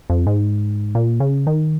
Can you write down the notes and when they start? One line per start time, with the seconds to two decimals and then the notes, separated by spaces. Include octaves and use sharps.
0.10 F2
0.27 G#2
0.95 A#2
1.20 C#3
1.47 D#3